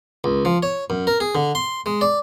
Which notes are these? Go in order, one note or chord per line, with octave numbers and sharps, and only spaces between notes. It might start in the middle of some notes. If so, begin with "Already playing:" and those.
C#2
F3
C#5
F#2
A#4
G#4
D3
C6
G#3
D5